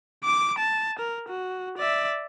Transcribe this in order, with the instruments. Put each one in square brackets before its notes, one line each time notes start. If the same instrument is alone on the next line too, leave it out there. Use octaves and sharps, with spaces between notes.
[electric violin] D6 D7
A5
A#4
F#4
D5 E5